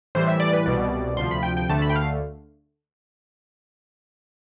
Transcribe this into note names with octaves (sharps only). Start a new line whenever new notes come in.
A2 E3 G3 C5
E5
D5
B4
C2 B2 G3 D5
D2 C3 F3 C6
B5
G5
G5
D2 D3 A3 A5
B5
G5
F5